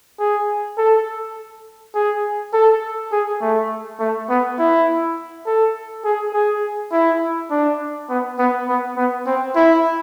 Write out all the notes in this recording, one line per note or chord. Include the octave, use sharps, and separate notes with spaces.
G#4
A4
G#4
A4
G#4
A3
A3
B3
E4
A4
G#4
G#4
E4
D4
B3
B3
B3
B3
C4
E4